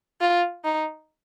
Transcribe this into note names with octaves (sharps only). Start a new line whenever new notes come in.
F4
D#4